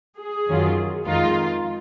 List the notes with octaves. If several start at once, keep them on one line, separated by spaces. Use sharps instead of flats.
G#4
F#2 D#3 F#3 C#4 F4
F2 D#3 G#3 D#4 F4